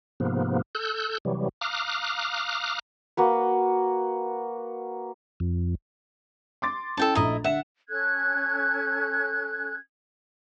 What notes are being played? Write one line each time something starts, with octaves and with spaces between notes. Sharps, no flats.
G#2 C3 F3 A#3 B3
A4 E6 F#6 G6
C3 E3 F#3 G3
F5 A#5 D6 D#6 F6 F#6
A#3 F#4 B4
F2
C6 D6 A6
C#4 E4 A4 G5 A5
A#1 A3 E4 D#5 A#5
D3 E5 F#5 E7
C#4 A4 F#6 G#6